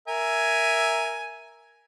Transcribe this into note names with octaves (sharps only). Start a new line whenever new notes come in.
A#4 E5 G#5